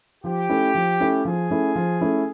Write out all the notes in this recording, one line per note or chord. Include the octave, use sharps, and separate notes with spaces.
F3 G4
A3 C#4 E4
F3
A3 C#4 E4
F3 G#4
A3 C#4 E4
F3
A3 C#4 E4